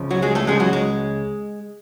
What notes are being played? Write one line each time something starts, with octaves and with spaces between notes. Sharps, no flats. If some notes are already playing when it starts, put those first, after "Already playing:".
Already playing: C#2 C#3 F3
F#3 F#4
G#3 G#4
A3 A4
C#2 C#3 F3 G#3 G#4
F#3 F#4
G#3